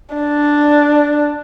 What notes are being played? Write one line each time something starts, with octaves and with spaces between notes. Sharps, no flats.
D4